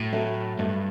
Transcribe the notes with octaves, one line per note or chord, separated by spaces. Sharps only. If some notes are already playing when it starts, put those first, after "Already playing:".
Already playing: A2 F#3
F#3 A3
G2 A3